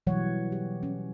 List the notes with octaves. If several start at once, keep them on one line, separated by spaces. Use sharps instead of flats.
B2 E3 F#3 G3 C#5 F#5
G4
C#4